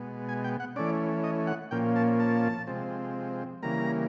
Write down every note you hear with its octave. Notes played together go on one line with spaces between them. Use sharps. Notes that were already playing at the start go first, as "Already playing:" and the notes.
Already playing: B2 G#3 B3
G#5
G5
F#5
E3 A3 C#4 D5
D#5
F#5
A#2 F3 A#3 C#4 G5
A5
A5
C3 F3 G#3 C4
C#3 E3 G3 A#3 A#5